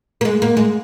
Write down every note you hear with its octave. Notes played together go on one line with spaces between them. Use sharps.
A#3
G#3
A#3
G#3